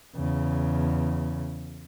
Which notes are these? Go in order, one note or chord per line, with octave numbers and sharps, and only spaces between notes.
E2 C#3